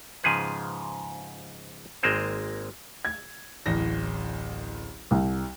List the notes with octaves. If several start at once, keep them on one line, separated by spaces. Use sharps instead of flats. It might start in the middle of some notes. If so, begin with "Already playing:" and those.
G#2 C#3 F3 G#4 B4
G#1 G#3 A#3 C4 C5
G#6
D1 A1 A#6
C2